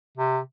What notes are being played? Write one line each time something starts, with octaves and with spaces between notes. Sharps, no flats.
C3